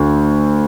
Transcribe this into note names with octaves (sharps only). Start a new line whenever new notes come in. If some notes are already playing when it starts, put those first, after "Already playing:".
Already playing: D2